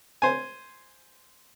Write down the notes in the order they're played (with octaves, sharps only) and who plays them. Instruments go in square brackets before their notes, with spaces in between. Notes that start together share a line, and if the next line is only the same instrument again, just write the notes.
[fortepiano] C5 G#5